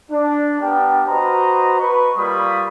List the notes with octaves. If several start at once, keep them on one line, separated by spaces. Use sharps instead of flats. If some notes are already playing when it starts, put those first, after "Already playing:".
D4
B3 D4 G4 A#4 G5 A5
F#4 B4 C5 D#5 A#5
B4 C#6
G3 A#3 F4 B5 C#6 D#6